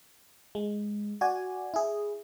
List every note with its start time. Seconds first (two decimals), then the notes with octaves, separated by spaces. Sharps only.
0.55 G#3
1.21 F#4 D5 G#5
1.74 E4 G#4